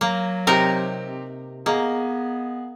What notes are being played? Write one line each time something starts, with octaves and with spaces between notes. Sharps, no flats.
F#3 A#3
C3 C4 D#4 G4 A#4
A#3 B3 G#4 D#5 A#5